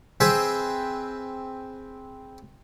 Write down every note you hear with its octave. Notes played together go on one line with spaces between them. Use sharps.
C4 G#4 B4 E5 G5